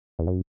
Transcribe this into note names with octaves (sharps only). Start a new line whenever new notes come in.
E2
F#2